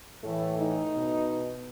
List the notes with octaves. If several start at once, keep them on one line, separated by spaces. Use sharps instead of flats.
A2 E3 A3
D#4
B2